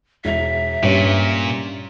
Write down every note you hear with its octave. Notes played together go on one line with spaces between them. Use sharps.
E1 E5 F7
G2 A#2 C#4 G4